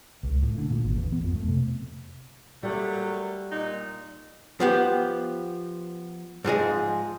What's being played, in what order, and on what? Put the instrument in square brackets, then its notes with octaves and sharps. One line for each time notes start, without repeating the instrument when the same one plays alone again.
[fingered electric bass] C#2
A2
D3
A#2
G#1
E2
B3
F2
A3
C3
[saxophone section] F#3 A3 A#3 [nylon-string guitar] G3
[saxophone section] A#2 D#4
[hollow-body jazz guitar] F3 B3 G4
G#2 F3 G#4 D#5